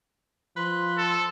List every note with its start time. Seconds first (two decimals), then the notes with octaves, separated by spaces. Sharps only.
0.57 F3 B4 C6
0.97 A4